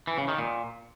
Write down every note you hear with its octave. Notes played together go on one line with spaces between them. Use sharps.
E3
C#3
D#3
A#2